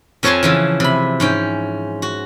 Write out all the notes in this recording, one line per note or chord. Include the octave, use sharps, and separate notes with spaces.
F2 F3 C#5 G#5 A5 C6
C#3 E3 F3
C3 B5
G#2 C#4 G5
F#4